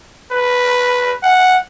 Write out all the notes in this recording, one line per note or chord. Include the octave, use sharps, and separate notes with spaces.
B4
F#5